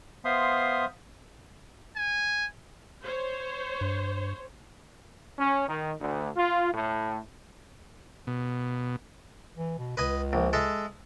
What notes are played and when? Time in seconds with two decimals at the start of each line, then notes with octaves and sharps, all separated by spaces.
0.25 B3 C5 E5 F5 C6 D#6
1.96 G#5
3.03 C5 C#5
3.81 G2
5.38 C#4
5.68 D#3
6.00 D2
6.36 F4
6.73 A2
8.27 B2
9.56 E3
9.78 B2
9.97 C#2 B4 D#5 G#5
10.33 A#1
10.53 G#3 A4 E5